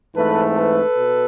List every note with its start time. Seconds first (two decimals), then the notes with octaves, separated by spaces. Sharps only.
0.15 G#2 E3 A3 C4 A4 B4
0.56 A4 B4
0.97 B2